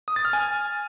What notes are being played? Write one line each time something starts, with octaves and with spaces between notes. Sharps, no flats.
D#6
A6
F6
G#5